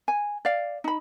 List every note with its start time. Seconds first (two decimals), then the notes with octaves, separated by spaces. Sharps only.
0.08 G#5
0.45 D5 F5
0.84 D#4 B5